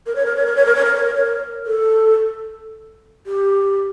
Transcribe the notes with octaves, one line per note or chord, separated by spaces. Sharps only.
A#4
C#5
A#4
C#5
A#4
C#5
A#4
C#5
A#4
C#5
A#4
C#5
A#4
A4
G4